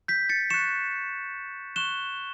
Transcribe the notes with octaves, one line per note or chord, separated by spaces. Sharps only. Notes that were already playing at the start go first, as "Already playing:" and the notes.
G6 B6
A6 C#7
C#6 F#6 C#7 E7
C#6 F#6 E7 G7